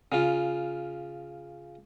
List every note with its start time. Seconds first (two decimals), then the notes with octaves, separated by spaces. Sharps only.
0.12 C#3 F4